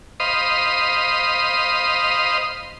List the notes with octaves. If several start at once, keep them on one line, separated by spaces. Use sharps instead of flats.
C5 D#5 F5 B5 C6 D#6